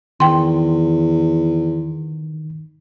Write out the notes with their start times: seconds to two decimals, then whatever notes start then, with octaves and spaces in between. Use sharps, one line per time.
0.20 E2 D#3 G5 C6